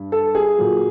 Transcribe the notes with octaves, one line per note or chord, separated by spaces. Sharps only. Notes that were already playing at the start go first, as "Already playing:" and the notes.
Already playing: G2
A4
G#4
A#2 F#3